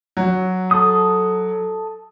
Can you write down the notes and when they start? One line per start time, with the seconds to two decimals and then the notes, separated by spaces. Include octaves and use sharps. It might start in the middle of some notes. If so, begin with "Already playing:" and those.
0.17 F#3
0.71 A4 D#6